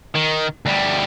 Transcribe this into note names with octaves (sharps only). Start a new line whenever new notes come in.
D#3
D2 G3